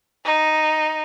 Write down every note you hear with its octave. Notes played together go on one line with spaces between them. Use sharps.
D#4